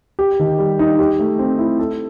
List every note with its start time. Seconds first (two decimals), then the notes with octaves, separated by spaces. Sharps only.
0.19 G4
0.39 D#3
0.59 G3
0.79 D#4
0.99 G4
1.19 A3
1.39 C4
1.59 E4
1.79 A4